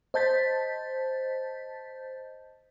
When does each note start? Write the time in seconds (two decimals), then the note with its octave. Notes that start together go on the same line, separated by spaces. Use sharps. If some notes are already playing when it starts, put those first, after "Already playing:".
0.14 C5 D#5 A5 G6 A6 B6